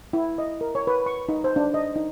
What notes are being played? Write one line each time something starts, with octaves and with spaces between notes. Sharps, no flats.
E4
D#5
A#4
C#5
B4
C#6
D#4
C5
D4
D#5
D#4